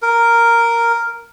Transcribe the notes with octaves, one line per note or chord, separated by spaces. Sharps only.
A#4